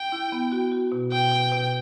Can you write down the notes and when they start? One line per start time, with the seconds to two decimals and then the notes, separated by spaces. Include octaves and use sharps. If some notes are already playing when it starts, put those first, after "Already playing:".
Already playing: G5
0.12 E4
0.32 B3
0.52 F#4
0.72 F#4
0.92 B2
1.12 B2 G5
1.31 B2
1.52 B2